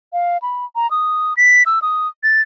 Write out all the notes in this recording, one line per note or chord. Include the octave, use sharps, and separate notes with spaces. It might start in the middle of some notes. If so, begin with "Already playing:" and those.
F5
B5
A#5
D#6
B6
E6
D#6
A6